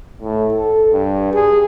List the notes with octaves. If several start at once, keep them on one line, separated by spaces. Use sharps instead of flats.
A2
A4
G2
G#4